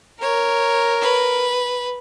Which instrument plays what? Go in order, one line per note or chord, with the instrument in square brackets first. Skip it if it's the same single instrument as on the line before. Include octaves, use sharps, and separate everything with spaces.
[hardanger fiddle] A#4 [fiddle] C#5
[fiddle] B4